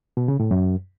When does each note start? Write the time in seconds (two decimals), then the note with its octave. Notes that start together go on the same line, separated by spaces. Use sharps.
0.17 B2
0.28 C#3
0.40 A2
0.51 F#2